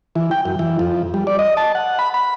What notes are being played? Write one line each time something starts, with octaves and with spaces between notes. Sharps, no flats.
E3
G5
F#2
E3
F2
G3
D5
D#5
A5
F#5
B5
B5